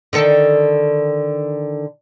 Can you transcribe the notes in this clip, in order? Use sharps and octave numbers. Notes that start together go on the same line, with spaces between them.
D3 D#3 A4